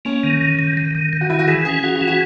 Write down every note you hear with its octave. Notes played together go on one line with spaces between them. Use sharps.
A#3 C#4
D#3
D#3
D#3
D#3
D#3
D#3
F#4
D#3 E4
F#4
E3 G#4
C#4 G#4
C#4 F#4
F#4
E3
F#4